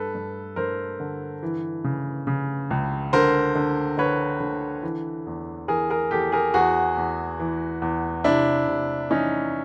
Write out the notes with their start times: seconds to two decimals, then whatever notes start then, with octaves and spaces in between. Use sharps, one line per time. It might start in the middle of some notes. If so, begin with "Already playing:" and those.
Already playing: G2 A4 B4
0.15 G2
0.56 G2 A#4 C5
1.00 D3
1.43 E3
1.84 C#3
2.27 C#3
2.71 C#2
3.13 D3 A#4 C5
3.55 D3
3.98 D3 B4 C#5
4.40 D3
4.83 E3
5.27 E2
5.68 E3 G#4 A#4
5.90 G#4 A#4
6.11 E2 G4 A4
6.32 G#4 A#4
6.54 E2 F#4 G#4
6.97 E2
7.40 E3
7.82 E2
8.24 C3 D4 E4
8.67 C3
9.10 E3 C#4 D#4